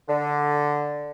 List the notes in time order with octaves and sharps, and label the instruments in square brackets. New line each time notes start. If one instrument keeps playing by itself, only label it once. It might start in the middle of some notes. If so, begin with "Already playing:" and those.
[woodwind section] D3